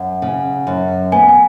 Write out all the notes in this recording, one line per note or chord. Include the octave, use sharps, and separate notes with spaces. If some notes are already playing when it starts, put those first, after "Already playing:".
Already playing: F#2 F#5
C#3
F#2
B3 G#5
G#5